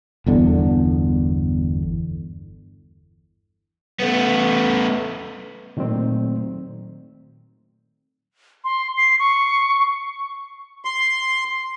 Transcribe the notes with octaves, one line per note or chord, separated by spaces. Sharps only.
G1 E2 D3
A3 B3
A#2 D#3 F#3 A3 C4
C6
C7
C#6
C6